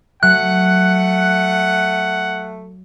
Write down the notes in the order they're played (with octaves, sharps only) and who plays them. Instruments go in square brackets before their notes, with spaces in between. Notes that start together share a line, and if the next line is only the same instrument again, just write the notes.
[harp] F#3 [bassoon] A3 [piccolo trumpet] F#5 [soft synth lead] F#6